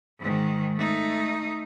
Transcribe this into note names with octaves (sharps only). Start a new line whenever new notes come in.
G#2 D#3
A3 D#4